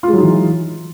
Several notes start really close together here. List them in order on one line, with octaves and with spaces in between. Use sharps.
F4 G#3 F#3 D#4 E3